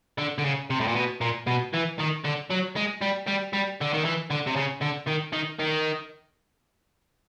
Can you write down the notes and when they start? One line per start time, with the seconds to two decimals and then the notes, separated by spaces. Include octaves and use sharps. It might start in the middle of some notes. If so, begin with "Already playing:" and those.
0.18 D3
0.38 D3
0.44 C#3
0.70 C3
0.81 A2
0.88 A#2
0.96 B2
1.21 A#2
1.47 B2
1.73 E3
1.99 D#3
2.24 D3
2.50 F#3
2.76 G#3
3.02 G3
3.27 G3
3.53 G3
3.81 D3
3.93 D#3
4.05 E3
4.31 D3
4.47 C3
4.56 C#3
4.82 D3
5.08 D#3
5.33 D#3
5.59 D#3